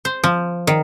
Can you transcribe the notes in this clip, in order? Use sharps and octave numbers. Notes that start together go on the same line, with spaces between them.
C5
F3
D#3